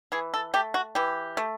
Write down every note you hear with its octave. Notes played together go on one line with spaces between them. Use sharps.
E3 G#4
A4
A3 G4
F#4
E3 G4
A3